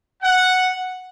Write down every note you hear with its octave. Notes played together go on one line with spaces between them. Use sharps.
F#5